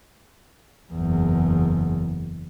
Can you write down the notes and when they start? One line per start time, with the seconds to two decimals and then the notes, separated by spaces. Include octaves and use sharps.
0.93 F#1 E2